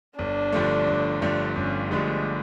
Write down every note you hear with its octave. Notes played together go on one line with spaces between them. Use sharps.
G1 D4
G2 D3 F3 A3
G1
G2 D3 F3 A3
G1 C#4
G2 D3 F3 G#3 A3